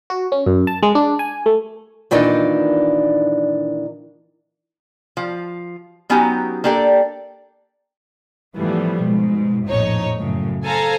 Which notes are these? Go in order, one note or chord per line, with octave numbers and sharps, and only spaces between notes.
F#4
C#4
F#2
A5
G#3
D4
G#5
A3
A#2 D#3 E3 D4 D#4 D5
F3
F#3 B3 C#4 D#4 F#4 G4
A#3 D4 G4 A4 D5
A2 E3 F3 G3 A3 B3
G#2 B2
A#1 F2 A2 D#4 C#5
F#2 A2 C#3
A4 C5 F5 G#5 A#5